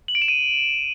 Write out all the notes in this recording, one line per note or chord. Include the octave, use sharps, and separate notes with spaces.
F#7
D7
E7
D#7